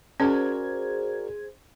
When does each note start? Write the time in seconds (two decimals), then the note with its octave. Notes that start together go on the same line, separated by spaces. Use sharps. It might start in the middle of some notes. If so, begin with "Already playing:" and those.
0.20 C#4 F#4 G#4 A#4 C5 D5 G#6